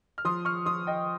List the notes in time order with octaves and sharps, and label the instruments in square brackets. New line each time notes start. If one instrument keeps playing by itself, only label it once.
[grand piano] F6
F3 C6 D#6
C#6 F6
F3 C6 D#6
D#5 G5